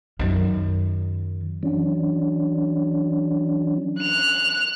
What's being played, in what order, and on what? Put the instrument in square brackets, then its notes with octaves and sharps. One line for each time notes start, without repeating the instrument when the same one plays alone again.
[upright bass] F#2 D#3
[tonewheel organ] E3 F#3 C#4 D4
[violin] F#6 F7